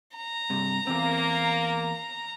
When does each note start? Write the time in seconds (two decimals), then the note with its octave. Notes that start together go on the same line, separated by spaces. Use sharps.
0.16 A#5
0.50 G2 C3
0.87 E2 A#3 C4